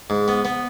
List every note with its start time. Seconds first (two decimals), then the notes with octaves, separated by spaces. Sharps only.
0.10 G#2
0.28 B3
0.45 B3